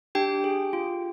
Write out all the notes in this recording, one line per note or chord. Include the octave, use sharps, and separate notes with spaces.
D4 G4 G5
G#4
F4